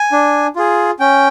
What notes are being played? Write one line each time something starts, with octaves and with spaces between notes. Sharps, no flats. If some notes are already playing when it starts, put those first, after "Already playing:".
Already playing: G#5
D4
F4 G#4
C#4 G5